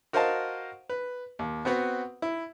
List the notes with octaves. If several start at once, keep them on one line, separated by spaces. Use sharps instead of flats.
F#4 A#4 C5 D#5 F5 A5
B4
D#2
B3 C4 F#4 B4
E4